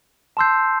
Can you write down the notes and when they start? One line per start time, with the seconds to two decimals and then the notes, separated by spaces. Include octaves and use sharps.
0.37 A5 C6 E6 G6 C7